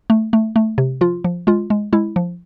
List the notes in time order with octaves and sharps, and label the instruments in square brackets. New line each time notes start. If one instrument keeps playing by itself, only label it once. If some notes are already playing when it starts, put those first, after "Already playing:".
[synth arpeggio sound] A3
A3
A3
C3
F3 F4
F3
G#3 F4
G#3
G#3 E4
F3